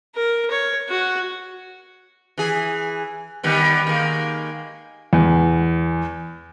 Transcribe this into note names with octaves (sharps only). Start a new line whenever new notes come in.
A#4
C#5
F#4
E3 G#4
D#3 G3 B3
D#3 G#3 A#3
E2